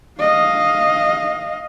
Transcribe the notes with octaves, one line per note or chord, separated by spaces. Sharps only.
D#5 F5